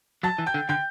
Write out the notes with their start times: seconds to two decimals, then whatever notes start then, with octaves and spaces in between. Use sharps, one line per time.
0.23 F#3 A5 A6
0.38 E3
0.46 G5 G6
0.54 D3
0.69 D3 G5 G6